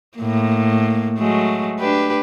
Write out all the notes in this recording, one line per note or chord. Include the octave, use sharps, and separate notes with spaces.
A2 A#3
F#3 G#3 A3
D4 G4 B4